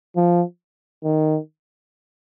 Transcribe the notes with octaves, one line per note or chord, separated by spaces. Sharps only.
F3
D#3